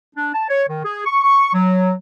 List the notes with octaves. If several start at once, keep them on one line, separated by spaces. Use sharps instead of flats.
D4
A5
C#5
D#3
G#4
C#6
C#6
F#3